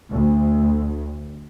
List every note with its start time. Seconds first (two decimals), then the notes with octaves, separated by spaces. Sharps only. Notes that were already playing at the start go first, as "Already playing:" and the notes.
0.11 D2